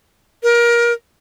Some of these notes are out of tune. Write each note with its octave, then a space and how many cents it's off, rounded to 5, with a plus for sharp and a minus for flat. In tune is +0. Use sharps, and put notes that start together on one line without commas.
A#4 +25